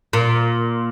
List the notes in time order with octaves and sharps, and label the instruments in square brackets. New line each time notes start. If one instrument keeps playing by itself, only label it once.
[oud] A#2